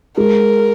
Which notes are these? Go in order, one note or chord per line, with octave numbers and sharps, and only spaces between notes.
G#3 A#4